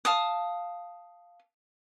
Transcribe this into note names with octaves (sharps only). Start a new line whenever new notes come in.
F5 A5 D#6